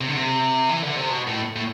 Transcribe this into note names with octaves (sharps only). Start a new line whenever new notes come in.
C3
D3
C3
E3
D3
C3
B2
A2
A2